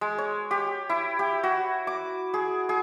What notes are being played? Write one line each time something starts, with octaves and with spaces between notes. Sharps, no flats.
G#3
C#5
G4
E4
G4
F#4
D6
G#4
G#4